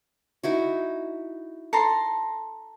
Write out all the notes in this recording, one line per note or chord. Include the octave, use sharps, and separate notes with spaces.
D#4 E4 F#4
A4 A#5 C6